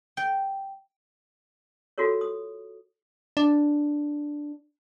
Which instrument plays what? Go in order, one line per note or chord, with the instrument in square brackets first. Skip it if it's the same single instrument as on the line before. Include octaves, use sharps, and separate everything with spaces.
[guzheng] G5
[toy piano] F4 F#4 A4 A#4 C#5
D#6
[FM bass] D4